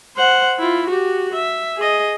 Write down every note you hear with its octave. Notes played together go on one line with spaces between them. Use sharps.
C5 F#5
E4 F4
F#4 G4
E5
G#4 D#5